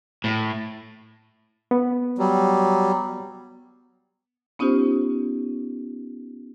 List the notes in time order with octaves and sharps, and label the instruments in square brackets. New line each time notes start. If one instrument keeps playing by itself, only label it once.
[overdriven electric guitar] A2
[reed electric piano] B3
[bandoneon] F#3 G3
[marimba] B3 C#4 D#4 F4 G4 C5